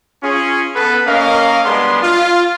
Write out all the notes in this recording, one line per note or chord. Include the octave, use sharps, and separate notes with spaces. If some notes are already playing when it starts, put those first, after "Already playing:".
C#4 F4 G#4
B3 A4 B4
A#3 C#4 A#4 D#5 F5
G3 G#3 B3 D4 G#4 C6
F4